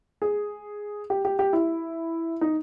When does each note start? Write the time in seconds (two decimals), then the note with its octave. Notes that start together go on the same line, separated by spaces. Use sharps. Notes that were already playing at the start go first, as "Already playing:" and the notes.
0.22 G#4
1.10 G4
1.25 G4
1.39 G4
1.53 E4
2.41 D#4